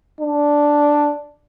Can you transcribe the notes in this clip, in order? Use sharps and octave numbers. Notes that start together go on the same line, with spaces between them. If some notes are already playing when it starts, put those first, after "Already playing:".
D4